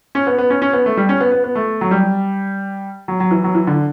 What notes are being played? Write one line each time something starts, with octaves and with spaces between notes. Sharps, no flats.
C#4
B3
B3
C#4
C#4
B3
A3
G3
C#4
B3
B3
B3
A3
F#3
G3
F#3
F#3
E3
F#3
E3
D3